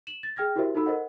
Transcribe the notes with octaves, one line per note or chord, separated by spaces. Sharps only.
E7 F#7
A6
G#4 G5 F6 G#6 A#6
E4 F#4 G4 A#4 C5 E5
D#4 F#4 A4 B5 E6
A#4 C5 D#5 F#5